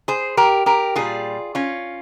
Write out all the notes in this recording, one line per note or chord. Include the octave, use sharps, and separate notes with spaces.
G#4 C5
G4 A#4
G4 A#4
A#2 G3 F4 G#4
C#4 F4